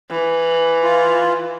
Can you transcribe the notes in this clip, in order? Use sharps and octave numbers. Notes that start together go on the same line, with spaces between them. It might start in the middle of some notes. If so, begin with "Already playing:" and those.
E3
F4